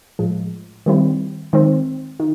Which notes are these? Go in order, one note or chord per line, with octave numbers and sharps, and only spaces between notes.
A2 F3 G#3
D#3 G3 C4 E4
D#3 G#3 C4
D#3